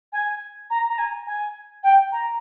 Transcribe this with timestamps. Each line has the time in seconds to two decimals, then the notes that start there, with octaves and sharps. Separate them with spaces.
0.12 G#5
0.70 A#5
0.89 A#5
0.98 G#5
1.26 G#5
1.83 G5
2.12 A#5